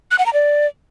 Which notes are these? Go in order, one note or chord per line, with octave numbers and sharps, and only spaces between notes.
F#6
F#5
A#5
D5